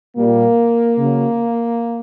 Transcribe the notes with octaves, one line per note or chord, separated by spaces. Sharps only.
A#2 G3 A#3
C#3 F#3